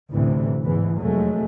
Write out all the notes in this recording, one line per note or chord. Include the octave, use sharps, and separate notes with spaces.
A1 D2 A2 C3 E3
E2 G#2 E3
F1 F#3 G#3 A3